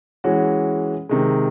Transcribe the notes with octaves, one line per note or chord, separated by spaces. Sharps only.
E3 G#3 C#4 F#4
C3 D#3 G#3